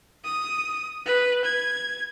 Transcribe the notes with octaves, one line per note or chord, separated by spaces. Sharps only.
D#6
B4
G#6